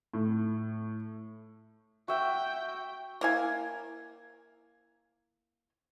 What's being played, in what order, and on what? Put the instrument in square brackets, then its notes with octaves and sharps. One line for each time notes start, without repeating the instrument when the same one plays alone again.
[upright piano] A2
[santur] F#4 E5 [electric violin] G5
[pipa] A#3 E4 G#5